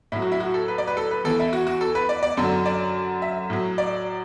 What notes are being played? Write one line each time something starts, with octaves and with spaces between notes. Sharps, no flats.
A2 F#3 E4
F#4
E4
F#4
A4
B4
D5
B4
A4
B4
E2 E3 A4
E4
F#4
F#4
A4
B4
D5
D5
F#2 D3 F#3 A4
D5
E5
A2 F#3
D5